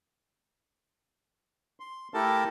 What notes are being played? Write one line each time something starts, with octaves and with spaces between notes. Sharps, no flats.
C6
A3 E4 G4 A4 A#4 A5